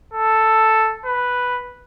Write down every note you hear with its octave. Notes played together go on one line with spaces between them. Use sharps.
A4
B4